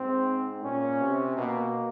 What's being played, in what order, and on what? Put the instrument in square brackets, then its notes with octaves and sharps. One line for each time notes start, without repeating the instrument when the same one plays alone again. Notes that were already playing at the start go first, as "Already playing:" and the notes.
Already playing: [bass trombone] G#2 [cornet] C4
[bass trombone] A#2 [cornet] C#4
[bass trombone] C3
[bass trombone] B2 [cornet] A#3